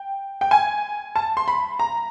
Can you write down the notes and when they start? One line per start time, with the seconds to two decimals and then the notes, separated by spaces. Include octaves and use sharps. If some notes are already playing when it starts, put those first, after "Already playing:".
Already playing: G5
0.41 G5
0.51 G#5
1.16 A5
1.37 C6
1.48 B5
1.79 A#5